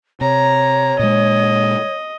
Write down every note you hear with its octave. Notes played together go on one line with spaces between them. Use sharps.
C3 C#5 A#5
A#2 G#3 D#5